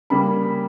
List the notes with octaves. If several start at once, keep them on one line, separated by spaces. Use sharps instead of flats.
C#3 G3 A#3 B5